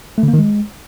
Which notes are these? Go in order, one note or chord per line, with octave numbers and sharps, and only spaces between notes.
A3
D3
A#3
D#3
G#3